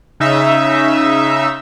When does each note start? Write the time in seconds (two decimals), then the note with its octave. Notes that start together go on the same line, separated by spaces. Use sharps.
0.20 C#3 D#4 E5